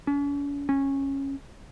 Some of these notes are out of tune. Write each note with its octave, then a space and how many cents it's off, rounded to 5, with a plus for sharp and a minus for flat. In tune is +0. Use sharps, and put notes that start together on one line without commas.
C#4 +45
C#4 -15